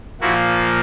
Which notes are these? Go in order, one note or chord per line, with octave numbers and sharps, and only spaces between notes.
A#2 F3 A#3 E4 F#4